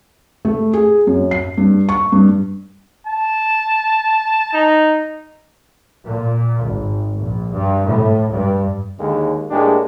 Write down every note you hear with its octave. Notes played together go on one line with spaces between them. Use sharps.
A3
G#4
F#2
C7
G2
C#6
G2
A5
D#4
A#2
G#1
A#1
G2
A2
G2
D#2 D3 G#3
A2 G#3 A#3 D4 G4 G#4